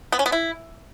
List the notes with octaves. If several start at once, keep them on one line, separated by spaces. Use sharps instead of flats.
B3
C#4
B3
E4